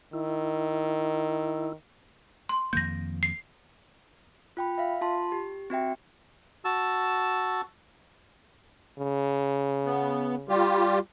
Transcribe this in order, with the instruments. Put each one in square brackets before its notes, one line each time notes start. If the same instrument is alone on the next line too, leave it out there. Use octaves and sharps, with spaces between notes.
[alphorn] D#3 [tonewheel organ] E4
[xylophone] C6
[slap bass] F2 D#3 A#3 [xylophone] G6 A#6
[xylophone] C7
[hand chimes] F4 G5 B5
E5 F5
F4 A5 C6
G4
C4 F#4 E5 G5
[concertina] F#4 A5 E6
[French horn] C#3
[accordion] B3
G3 F4 G4